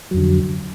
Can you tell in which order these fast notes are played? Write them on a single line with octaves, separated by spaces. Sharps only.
F#3 F2 D3